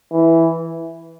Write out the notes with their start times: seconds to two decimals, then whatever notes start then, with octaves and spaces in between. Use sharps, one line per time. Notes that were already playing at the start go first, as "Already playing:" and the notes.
0.12 E3